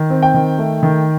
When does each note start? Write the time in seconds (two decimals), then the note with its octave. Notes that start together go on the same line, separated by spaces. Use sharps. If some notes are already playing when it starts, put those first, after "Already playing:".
Already playing: D#3
0.10 C4
0.23 G5
0.34 D#3
0.58 A3
0.83 D#3